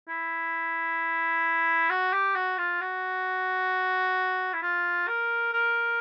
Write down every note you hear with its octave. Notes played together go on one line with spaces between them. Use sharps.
E4
F#4
G4
F#4
F4
F#4
E4
F4
A#4
A#4